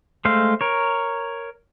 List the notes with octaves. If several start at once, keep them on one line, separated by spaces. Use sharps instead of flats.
G#3 A3 C5 F5
A#4 C#5